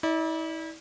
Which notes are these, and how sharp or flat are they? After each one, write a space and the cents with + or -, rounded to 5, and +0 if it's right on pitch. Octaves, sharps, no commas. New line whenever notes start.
E4 -40 D5 +0